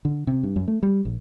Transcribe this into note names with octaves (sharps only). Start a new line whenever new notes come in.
D3
C3
G2
F#2
A3
G3
A#1